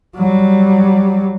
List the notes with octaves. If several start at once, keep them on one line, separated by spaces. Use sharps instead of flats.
F#3 G3